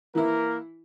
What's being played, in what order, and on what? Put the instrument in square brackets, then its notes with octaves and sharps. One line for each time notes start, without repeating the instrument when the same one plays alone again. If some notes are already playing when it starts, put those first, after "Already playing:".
[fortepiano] E3 E4 [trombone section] A#3 A#4